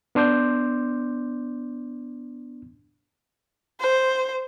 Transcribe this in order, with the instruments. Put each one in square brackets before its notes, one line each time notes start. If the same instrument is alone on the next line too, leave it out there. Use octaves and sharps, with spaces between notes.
[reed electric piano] B3 D4 C6 D6 G6
[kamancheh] C5